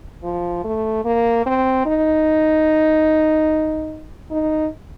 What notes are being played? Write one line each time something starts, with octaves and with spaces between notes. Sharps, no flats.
F3
A3
A#3
C4
D#4
D#4